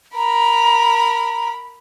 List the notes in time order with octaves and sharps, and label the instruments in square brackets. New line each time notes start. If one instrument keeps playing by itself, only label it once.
[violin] A#4 B5 [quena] A#5